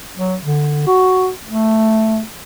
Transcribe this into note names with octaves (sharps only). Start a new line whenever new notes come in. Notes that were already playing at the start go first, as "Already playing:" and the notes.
F#3
D3
F#4
A3